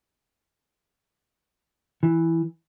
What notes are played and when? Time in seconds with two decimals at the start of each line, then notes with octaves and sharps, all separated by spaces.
2.03 E3